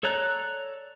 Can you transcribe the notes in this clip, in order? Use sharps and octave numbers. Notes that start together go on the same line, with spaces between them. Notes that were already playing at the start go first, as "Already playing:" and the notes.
A4 C#5 D5 A#5 F#6